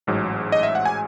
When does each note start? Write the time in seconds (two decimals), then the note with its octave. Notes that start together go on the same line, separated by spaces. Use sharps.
0.07 A1 G#2 F#3
0.52 D#5
0.63 E5
0.75 F#5
0.86 G#5